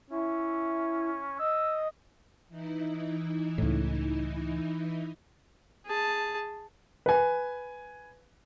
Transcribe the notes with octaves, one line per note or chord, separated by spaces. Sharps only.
C#4 E4
D#5 E6
E3 D#4 E4
C#2 A2
G#4 A5
B4 G#5